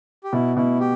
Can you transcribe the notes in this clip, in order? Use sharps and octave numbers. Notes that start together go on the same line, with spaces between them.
G4
B2 E4
B2 E4
G4